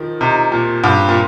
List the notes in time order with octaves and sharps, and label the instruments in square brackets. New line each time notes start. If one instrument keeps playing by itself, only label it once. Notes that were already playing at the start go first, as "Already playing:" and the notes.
Already playing: [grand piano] D#3 F3
[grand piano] C3 [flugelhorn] D#4
[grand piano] A#2
[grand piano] G2 [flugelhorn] C4
[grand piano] A#2